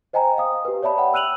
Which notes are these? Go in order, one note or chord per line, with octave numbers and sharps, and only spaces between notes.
C5 D#5 G5 G#5 A#5
F5 D#6
G4 B4
C#5 D5 E5 A5 B5
F#5 G5 B5
E6 F#6 D#7 F7 F#7